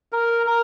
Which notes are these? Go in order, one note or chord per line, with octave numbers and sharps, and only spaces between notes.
A#4
A#4